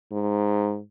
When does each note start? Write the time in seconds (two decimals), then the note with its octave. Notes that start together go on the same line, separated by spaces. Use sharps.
0.12 G#2